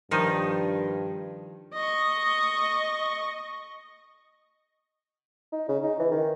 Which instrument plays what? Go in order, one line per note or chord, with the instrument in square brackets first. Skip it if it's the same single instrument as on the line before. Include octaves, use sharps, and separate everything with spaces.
[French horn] G2 [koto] D#3 F3 D#4
[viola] D#5 C#6
[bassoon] D#4
C#3
D#4
E3
D#3